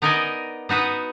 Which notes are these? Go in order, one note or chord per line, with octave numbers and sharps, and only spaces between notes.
B3 D#4 A#4 D5 D#5 G#5
B3 D#4 F#4 B4